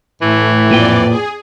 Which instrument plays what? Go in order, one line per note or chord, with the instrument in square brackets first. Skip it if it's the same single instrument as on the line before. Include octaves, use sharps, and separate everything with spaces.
[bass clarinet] A2 [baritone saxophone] E3 [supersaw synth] A3
[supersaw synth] F2 D5 [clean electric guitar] A#2 B4 G5
[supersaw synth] G#4